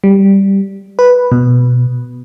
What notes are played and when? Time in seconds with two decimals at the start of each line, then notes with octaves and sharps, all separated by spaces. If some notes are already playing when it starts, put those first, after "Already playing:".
0.04 G3
0.99 B4
1.32 B2